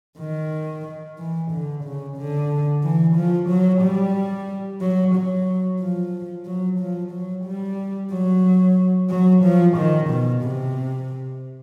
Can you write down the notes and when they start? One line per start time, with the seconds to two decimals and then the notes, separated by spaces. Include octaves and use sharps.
0.19 D#3
1.19 E3
1.51 D3
1.84 C#3
2.17 D3
2.83 E3
3.16 F3
3.49 F#3
3.82 G3
4.81 F#3
5.15 F#3
5.80 F3
6.46 F#3
6.80 F3
7.12 F#3
7.45 G3
8.11 F#3
9.10 F#3
9.43 F3
9.77 D#3
10.09 B2
10.43 C3